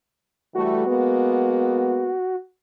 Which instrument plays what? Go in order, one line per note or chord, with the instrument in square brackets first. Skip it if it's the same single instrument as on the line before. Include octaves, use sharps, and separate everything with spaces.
[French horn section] E3 G3 A3 [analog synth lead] F#4
[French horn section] G#3 A#3 B3